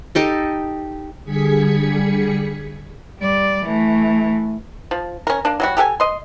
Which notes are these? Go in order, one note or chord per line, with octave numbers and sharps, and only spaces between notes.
D#4 G4 A4
D3 G3 G#4 G#6 B6 C#7
G3 D5
E3 A3
F3
C#4 A#4
A#3 D4
F#3 G3 F#4
G4 A4 F#5 G#5
D#5 C6